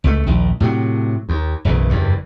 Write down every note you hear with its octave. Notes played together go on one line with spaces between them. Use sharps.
C#2 F#3 A3
A#1 D#2
A2 C3 E3 F#3
D#2
F#1 B1 C#3 E3
F#1 E2 G2